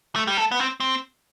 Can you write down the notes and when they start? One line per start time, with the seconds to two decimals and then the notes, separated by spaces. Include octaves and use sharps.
0.16 A3
0.27 G3
0.37 A3
0.51 B3
0.60 C4
0.80 C4